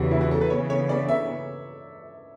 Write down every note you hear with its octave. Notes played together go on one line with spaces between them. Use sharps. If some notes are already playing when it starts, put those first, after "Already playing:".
Already playing: E2 C#3 E3 F#4 G4
E4
F#4
A4
B4
C#3 E3 B3 C#5
C#5
D5
E5